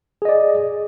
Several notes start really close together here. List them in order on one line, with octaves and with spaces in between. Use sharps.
G#4 D#5 D5